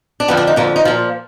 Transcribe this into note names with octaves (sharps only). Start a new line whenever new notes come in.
D4
F2 D3 F3 B3
D4
D#4
F2 D3 F3 A#3
D#4
A#2 F3 F4